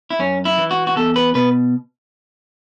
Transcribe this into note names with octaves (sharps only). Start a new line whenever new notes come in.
E4
F#2 C#4
E4
E3
F#4
F#4
E2 A4
B4
B2 B4